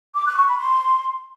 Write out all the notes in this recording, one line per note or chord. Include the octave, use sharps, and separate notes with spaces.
D6
F#6
C#6
B5
C6